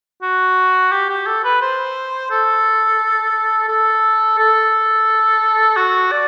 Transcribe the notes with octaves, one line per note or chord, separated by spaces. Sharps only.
F#4
G4
G4
A4
B4
C5
A4
A4
A4
F#4
D5